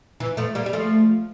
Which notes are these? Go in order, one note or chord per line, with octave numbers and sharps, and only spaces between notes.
E3
F3 A3
G3 A#3
G3
F3 A3